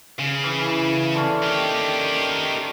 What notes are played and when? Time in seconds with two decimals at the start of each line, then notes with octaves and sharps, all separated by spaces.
0.19 C#3
0.43 E3
1.14 D3 C#4
1.43 D#3 G4